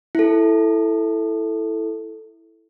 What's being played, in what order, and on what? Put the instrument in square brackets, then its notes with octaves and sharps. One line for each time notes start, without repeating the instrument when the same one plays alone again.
[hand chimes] E4 A4